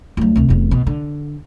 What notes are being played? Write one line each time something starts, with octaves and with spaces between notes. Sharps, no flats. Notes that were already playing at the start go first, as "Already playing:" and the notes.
D2 F#3
D2 C3
F1 E2
B2
D3